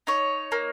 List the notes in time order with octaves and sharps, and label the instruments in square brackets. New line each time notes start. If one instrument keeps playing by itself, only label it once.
[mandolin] D#4 C#5
A#3